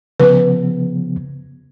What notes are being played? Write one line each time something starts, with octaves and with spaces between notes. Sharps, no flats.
C#3 F3 B3 B4